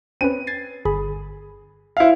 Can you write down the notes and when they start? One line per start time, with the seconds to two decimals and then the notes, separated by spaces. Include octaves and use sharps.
0.21 C4 C#4 B4 D#7
0.47 G#6 A6 C7
0.85 G1 G#4 B5
1.97 E4 C5 E5 F5